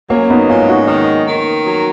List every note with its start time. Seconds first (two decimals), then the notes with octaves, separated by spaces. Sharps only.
0.10 F#3 A#3 C#4
0.30 B3 D#4
0.49 G#2 C#4 F4
0.68 D#4 F#4
0.87 D#3
1.27 D#3
1.65 F#3